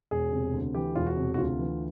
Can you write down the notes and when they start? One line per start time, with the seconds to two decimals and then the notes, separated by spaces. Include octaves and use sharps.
0.11 E1 G#4
0.32 C3
0.54 D2
0.75 E3 G4
0.96 E1 F4
1.07 F#4
1.17 C3
1.34 F#4
1.38 D2 F4
1.59 E3